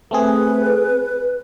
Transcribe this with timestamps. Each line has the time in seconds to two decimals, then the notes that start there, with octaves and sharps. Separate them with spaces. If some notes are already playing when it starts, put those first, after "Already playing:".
0.11 A3 C4 G#4 B4